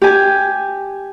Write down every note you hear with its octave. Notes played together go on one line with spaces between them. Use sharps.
G4 G#5